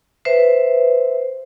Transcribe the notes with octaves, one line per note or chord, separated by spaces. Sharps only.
B4 C5 E5